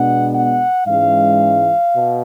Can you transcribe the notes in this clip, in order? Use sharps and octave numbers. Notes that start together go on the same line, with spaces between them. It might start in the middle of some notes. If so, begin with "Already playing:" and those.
Already playing: B2 G#3 B3 D4 F#5
F#5
G#2 E3 G#3 C#4 F5
B2